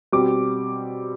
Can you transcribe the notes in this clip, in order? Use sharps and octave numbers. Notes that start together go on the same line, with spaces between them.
B2 G3 C4 D6